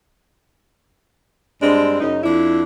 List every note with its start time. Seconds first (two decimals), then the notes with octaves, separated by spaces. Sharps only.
1.61 G2 G#3 C4 D4
2.01 F#2 C#3 D#4
2.23 F2 D4 E4